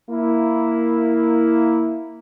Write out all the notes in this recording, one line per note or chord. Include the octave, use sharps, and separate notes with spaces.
A#3 E4